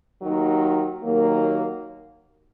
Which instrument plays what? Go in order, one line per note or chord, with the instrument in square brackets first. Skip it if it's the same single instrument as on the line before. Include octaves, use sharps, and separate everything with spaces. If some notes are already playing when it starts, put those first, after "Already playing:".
[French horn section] D#2 D#3 F#3
D#2 D#3 F#3 A#3